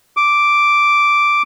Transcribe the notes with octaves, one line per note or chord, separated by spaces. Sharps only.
D6